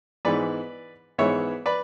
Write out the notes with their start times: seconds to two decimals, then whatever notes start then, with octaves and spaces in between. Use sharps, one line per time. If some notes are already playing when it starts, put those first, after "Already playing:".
0.25 G#2 E3 G#3 B3 B4 D5
1.18 G#2 E3 G#3 B3 C#5 E5
1.66 B4 D5